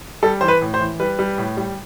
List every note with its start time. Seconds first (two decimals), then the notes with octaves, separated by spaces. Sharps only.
0.23 G3 A4
0.41 E3 C5
0.48 B4
0.61 A2
0.74 C5
0.80 E3
1.00 G3 B4
1.19 G3
1.38 A2
1.57 G3